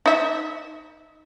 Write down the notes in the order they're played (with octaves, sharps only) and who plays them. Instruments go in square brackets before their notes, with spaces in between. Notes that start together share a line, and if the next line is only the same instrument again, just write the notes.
[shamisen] D#4 E5